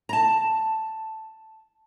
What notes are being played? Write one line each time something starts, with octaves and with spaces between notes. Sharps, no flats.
A5 A#5